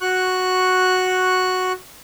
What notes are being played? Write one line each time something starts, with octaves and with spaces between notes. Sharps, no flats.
F#4 C#6 F#6